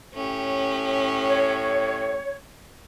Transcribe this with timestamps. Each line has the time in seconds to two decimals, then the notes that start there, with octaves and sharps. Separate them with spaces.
0.14 A2 C#4 G4
1.27 C#5